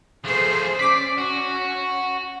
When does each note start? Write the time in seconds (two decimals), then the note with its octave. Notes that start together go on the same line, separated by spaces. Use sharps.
0.24 F3 A3 G#4 C5
0.79 C#4 D5 D6 B6
1.18 F#4